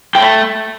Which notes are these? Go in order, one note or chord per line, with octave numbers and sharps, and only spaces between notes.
A3 G5